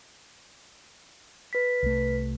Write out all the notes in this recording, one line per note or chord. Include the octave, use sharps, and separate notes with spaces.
B4 B6
C2 A3